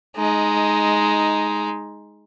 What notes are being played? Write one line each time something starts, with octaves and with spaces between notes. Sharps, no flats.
G#3 D#4